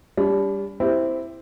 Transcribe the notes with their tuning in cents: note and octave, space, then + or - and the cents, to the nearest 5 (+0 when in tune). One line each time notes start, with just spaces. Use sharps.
G3 +20 D4 -35
C4 -10 E4 +0 G4 +0